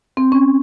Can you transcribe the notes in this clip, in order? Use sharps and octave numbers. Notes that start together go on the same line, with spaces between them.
C4
C#4